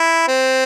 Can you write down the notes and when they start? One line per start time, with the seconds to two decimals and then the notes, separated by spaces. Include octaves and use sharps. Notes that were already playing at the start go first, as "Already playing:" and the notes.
Already playing: E4
0.28 C4